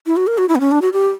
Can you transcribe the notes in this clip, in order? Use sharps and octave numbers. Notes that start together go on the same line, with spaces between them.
E4
F#4
A#4
F#4
E4
B3
C#4
D4
F#4
G4